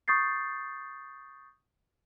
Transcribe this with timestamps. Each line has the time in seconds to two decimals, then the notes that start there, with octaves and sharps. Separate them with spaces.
0.08 C#6 D#6 G6 A6 C7